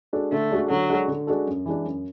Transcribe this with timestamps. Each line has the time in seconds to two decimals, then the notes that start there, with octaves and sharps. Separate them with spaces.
0.13 G#3 D4 F#4 A4
0.32 D3 A3
0.51 G#3 D4 F#4 A4
0.69 D3 F#3
0.90 G#3 D4 F#4 A4
1.08 D3
1.27 G#3 D4 F#4 A4
1.47 F#2
1.66 E3 G#3 D4
1.85 F#2